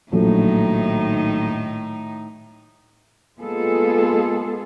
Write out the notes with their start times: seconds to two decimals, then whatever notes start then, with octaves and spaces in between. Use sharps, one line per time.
0.12 A#1 A2 D#3 F#3 A3 D#4
3.38 G#3 A#3 B3 F4 G#4 A4